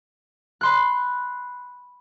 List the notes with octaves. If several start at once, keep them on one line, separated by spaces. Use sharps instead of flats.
B5 C6 F#6